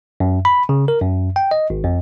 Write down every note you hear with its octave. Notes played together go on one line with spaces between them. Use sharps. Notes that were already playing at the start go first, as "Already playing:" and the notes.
F#2
B5
C#3
A#4
F#2
G5
D#5
G#1
F2